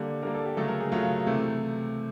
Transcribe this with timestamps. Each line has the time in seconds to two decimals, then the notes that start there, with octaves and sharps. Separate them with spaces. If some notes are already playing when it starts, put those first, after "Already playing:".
Already playing: D3 G3 A#3
0.22 D3 G3 A#3 A#4
0.34 A4
0.46 G4
0.57 C#3 F#3 A3 A4
0.68 A#4
0.80 G#4
0.92 C#3 F#3 A3 F4
1.27 C3 E3 A3